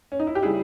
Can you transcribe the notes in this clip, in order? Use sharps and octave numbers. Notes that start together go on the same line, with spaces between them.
C#4
D#4
E4
G4
C#3 G3 E4 G#4